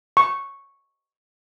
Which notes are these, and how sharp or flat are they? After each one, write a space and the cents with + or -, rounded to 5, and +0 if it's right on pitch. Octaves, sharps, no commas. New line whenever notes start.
C#6 -5